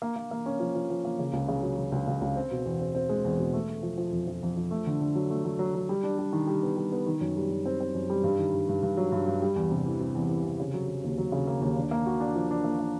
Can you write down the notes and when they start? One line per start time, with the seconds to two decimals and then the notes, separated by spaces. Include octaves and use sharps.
0.02 A#3
0.16 A#3
0.31 A#3
0.46 C#4
0.60 F3
0.75 F3
0.90 F3
1.05 A#3
1.19 C#3
1.33 C#2
1.48 C#3
1.62 F#3
1.78 F#3
1.92 C#2
2.07 C#2
2.21 C#2
2.36 C4
2.51 B2
2.65 E2
2.80 C4
2.95 C4
3.09 G#3
3.25 E2
3.39 B2
3.53 A3
3.69 A3
3.83 F3
3.98 F3
4.12 F2
4.27 F3
4.43 F2
4.57 F3
4.71 A3
4.87 D3
5.01 D3
5.15 F#3
5.30 A3
5.44 F#3
5.59 F#3
5.75 F#3
5.89 G3
6.03 D4
6.19 G3
6.33 D#3
6.47 G3
6.63 B3
6.77 G3
6.92 B3
7.06 D#3
7.21 F#2
7.36 G3
7.50 F#2
7.66 C4
7.80 C4
7.94 F#2
8.10 G3
8.24 G2
8.38 D#3
8.53 G2
8.69 G2
8.83 G2
8.97 F#3
9.12 G2
9.27 G2
9.42 G3
9.56 E2
9.71 C3
9.86 E3
10.00 C3
10.15 E2
10.29 E3
10.44 C3
10.60 C#3
10.74 F#3
10.88 F#3
11.04 D#2
11.18 F#3
11.32 C#3
11.47 A#3
11.61 D#2
11.77 D4
11.91 A#3
12.06 F#4
12.20 D4
12.36 F3
12.51 D4
12.64 A#3
12.79 A#3